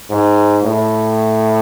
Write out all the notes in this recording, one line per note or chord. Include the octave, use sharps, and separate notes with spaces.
G#2
A2